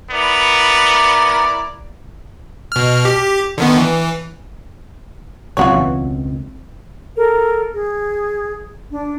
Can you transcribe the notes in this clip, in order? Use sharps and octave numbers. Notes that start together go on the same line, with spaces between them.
B3 E4 A#4 D5
B2 F6
G4
D3 D#3 B3
E3
E1 C#2 F#3 C4 F4 F#4 C#5 F#6
B1 B2 E3
A4 A#4
G#4
D4